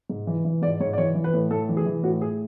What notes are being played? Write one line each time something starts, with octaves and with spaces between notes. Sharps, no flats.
G#2
E3
E3
G#2 D5
G#2 C#5
D5
E3 C#5
E3
B4
A2
A2 A4
E3
G#4
E3
A2 F#4
A2 G#4